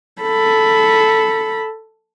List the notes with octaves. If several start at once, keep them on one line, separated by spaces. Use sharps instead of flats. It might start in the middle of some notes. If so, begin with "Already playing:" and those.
A4 B5